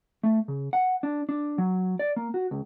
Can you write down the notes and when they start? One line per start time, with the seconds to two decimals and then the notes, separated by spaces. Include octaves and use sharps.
0.23 A3
0.48 C#3
0.73 F#5
1.03 D4
1.29 D4
1.58 F#3
1.99 D5
2.16 A#3
2.34 F#4
2.51 C#2